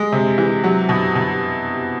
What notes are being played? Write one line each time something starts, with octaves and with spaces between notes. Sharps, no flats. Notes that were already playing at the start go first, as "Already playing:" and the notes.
Already playing: G#3
C3
E3
F#3
B2
B2